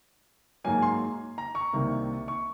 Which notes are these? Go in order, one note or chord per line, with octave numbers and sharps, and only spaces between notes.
G#2 F#3 A#3 G#5
C6
A#5
C#6
C2 C3 D#3 A#3
C#6